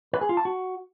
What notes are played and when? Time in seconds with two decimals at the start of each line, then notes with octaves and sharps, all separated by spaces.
0.13 B4
0.21 G#4
0.29 F4
0.37 A5
0.45 F#4